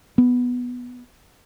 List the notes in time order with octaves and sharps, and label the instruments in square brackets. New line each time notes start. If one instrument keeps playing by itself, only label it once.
[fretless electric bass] B3